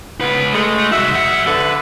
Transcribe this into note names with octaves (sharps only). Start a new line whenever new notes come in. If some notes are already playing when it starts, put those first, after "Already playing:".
C#2 B3 B4
G#3 A3
C2 F#4 E5
F2 F#5
D3 B4